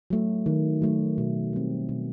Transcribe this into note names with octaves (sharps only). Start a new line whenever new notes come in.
F#3 A3
D#3
F#3 A3
B2
G3 C4
B2